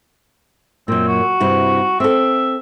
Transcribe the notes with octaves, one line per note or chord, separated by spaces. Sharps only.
F#2 A#2 C4
F#4
G2 C3 E4
C4 A4 E5